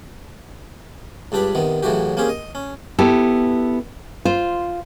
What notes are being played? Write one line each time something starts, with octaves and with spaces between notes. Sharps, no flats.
C#2 G2 D4 G4 B5
C3 D#3 B3
A2 C#3 E3 F#3 F#4 G4
A#3 C4 C#4 G4 G#4
D#5
C#4
B3 E4 G4 A4
F4 C5